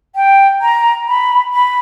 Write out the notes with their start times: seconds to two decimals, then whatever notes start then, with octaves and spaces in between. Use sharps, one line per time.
0.15 G5
0.61 A#5
1.08 B5
1.54 B5